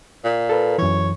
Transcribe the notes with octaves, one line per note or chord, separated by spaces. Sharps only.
A#2
A4 B4
F#2 E3 C#5